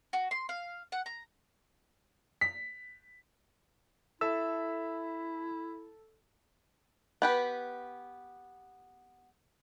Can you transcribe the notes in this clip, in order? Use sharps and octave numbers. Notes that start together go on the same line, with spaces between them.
F#4
C6
F5
F#5
A#5
B6
E4 A4 E5 E6
B3 G4 B4